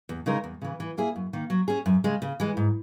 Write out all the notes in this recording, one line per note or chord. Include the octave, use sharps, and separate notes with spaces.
E2
C#3 G#3 D#4 A#4
E2
C#3 E3
E3
A#3 E4 G#4
F#2
D#3 A#3
F#3
C#4 G#4
F#2
C#3 G#3
C#3
E3 G#3
G#2